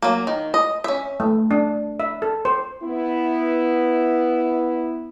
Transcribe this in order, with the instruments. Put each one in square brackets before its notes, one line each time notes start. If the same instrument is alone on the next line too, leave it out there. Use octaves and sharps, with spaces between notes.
[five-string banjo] F#3 A#3
D#3
D#5
C#4 E5
[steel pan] A3
D4
E5
A4
C5
[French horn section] B3 E4